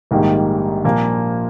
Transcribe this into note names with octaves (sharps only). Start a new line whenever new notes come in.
A#1 G#2 D#3 G3 A#3
A#2 F3 A#3